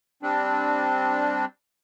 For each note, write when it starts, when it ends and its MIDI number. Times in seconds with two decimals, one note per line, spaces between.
0.23 1.45 55
0.23 1.45 60
0.23 1.45 62